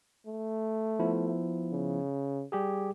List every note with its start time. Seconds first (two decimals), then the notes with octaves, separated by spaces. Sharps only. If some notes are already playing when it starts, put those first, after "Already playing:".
0.27 A3
0.99 F3 B3 E4
1.72 C#3
2.52 G3 G4 G#4